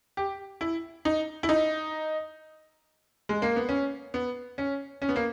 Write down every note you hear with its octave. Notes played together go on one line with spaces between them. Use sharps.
G4
E4
D#4
E4
D#4
G#3
A#3
B3
C#4
B3
C#4
C#4
B3
A#3